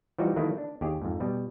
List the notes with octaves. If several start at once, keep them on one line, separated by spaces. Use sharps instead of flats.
E3 F3 G3 D#4 F#4
D#3 E3 F#3 A3 A#3 E4
D4
D#2 G4 G#4
F2 G#2
B2 G3